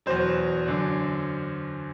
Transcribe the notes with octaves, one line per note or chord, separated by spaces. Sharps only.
E2 B2 F#3 C5
F#2 D3 F#3